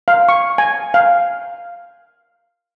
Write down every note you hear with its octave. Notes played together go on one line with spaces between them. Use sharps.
F5
C#6
G#5
F5